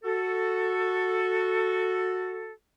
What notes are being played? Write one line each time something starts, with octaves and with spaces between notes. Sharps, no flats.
F#4 A4